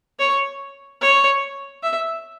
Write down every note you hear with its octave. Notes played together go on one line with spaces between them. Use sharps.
C#5
C#5
E5